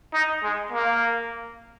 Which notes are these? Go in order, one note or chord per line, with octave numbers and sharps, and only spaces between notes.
D#4
G#3
A#3